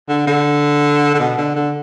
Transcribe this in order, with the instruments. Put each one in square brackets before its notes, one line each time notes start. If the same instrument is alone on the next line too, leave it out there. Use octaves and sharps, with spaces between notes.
[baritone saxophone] D3
D3
D3
B2
D3
D3